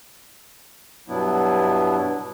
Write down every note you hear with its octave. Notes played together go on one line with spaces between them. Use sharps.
G2 B2 F#3 B3 D4 E4